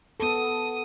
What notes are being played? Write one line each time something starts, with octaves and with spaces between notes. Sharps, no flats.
B3 A4 D#6